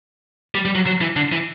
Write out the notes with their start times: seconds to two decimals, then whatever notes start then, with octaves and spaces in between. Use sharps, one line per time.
0.55 G3
0.65 G3
0.75 F#3
0.86 F#3
1.01 E3
1.16 D3
1.32 E3